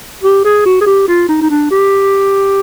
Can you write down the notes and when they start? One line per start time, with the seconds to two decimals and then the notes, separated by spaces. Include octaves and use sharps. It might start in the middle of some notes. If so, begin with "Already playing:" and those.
0.23 G4
0.45 G#4
0.66 F#4
0.81 G#4
0.87 G4
1.08 F4
1.29 D#4
1.41 D#4
1.51 D4
1.71 G4